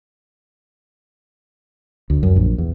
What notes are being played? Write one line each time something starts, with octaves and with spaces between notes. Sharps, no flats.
D2
F#2
A#1
E2